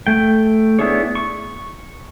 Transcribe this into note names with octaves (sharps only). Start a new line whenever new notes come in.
A3 G5
B3 D4 E4 G#4 C#5
C#6